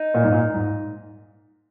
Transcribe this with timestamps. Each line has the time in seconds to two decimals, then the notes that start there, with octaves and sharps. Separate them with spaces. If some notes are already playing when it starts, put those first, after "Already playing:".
Already playing: D#4
0.14 A#2
0.23 G#2
0.32 A#2
0.54 G#2